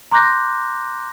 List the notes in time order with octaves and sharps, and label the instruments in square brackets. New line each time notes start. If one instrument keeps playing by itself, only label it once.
[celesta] A#5 C6 D6 F#6 G6 A#6